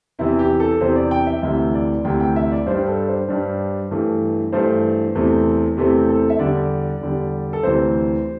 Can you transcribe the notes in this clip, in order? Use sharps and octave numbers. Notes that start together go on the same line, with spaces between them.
E2 C3 E3 E4
G4
A4
E2 C3 E3 C5
D5
G5
E5
D2 C3 E3 E5
D5
D2 C3 E3 G5
G5
E5
D5
G2 G3 D4 C5
A4
C5
G2 G3 D4
G2 E3 A3
G2 E3 A3 C5
E2 C3 E3 A3 C4
E2 C3 E3 A3 C4 G4
A4
E5
E2 D3 G3 D5
E2 D3 G3
A4
D2 C3 E3 C5